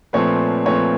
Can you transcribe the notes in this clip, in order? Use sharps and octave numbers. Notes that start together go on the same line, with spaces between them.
A#2 F3 A3 C4 B4 C#5
A#2 F3 A3 C4 B4 C#5